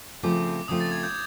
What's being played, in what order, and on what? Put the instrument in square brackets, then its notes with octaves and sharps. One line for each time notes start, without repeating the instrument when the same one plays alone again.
[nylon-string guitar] C#3 F3 A3 C4 [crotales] D6
[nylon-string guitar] C#3 F3 A3 C4 [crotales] D#6
[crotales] A6
G#6
G6